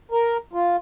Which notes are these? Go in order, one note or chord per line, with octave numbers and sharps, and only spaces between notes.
A#4
F4